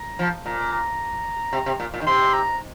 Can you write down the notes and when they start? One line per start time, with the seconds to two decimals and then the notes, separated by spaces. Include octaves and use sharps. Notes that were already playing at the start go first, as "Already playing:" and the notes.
Already playing: A#5
0.19 F3
0.46 A#2 A#5
0.73 A#5
1.53 C3
1.66 C3
1.80 A#2
1.94 A#2
2.01 D#3
2.07 C3 C6
2.33 A#5